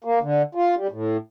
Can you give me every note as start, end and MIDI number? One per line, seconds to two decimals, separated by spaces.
0.04 0.19 58
0.22 0.42 50
0.55 0.75 65
0.76 0.87 55
0.91 1.17 45